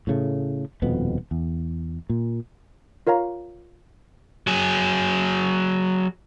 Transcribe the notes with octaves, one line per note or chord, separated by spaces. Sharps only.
A2 C#3 A3
D#1 F2 B2 B3
E2
A#2
F4 A#4 C#5 F5 A#5
F#3 G#4